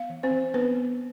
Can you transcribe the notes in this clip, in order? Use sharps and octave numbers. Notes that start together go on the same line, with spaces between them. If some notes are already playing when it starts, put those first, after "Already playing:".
Already playing: B3 F5
E3
C4 C5
E3
B3 D4 B4
B3